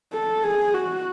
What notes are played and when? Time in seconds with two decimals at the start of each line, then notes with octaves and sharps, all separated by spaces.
0.13 A4
0.44 G#4
0.74 F#4